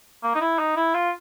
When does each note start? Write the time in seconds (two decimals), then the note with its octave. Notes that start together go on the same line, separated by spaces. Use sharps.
0.23 A#3
0.35 D#4
0.41 E4
0.59 D#4
0.76 E4
0.94 F4